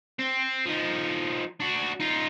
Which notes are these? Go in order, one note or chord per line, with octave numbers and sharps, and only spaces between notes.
C4
F3 D#4
D4 F#4
D#4 F4